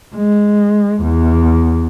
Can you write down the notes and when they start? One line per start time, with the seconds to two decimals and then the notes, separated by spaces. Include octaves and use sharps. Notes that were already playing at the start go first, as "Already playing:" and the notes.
0.15 G#3
1.02 E2